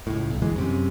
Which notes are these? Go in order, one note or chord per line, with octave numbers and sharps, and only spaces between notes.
C#2 A2
B1
G1 E3 G#3
F#2 C3